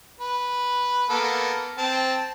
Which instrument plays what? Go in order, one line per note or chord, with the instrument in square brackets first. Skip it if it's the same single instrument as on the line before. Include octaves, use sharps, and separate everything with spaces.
[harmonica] B4
A#3 B3 A4
C4 A5